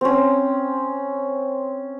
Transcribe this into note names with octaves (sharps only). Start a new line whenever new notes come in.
C4 C#4